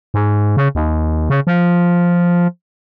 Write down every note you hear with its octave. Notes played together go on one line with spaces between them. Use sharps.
G#2
C#3
D#2
C#3
F3